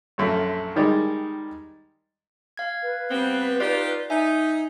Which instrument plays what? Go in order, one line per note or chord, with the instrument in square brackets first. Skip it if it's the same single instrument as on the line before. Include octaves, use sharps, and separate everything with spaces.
[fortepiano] A#1 F#2 A3
D#3 G3 G#3
[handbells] F5 G#6
[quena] B4
[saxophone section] G3 B3 C4
[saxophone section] D#4 F4 G4 [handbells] D5
[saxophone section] D#4 [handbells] E5 G#5